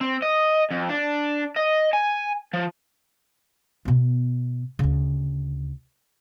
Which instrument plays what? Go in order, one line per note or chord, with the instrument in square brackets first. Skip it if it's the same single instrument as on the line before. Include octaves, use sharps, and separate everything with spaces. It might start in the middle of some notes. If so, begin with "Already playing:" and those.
[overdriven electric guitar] C4
D#5
F2
D4
D#5
G#5
F3
[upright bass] B2 B3
D2 C#3